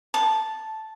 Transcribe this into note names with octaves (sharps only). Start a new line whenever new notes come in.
A5